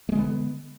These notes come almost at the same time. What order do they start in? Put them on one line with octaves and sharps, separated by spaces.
A3 G#3 D3 B3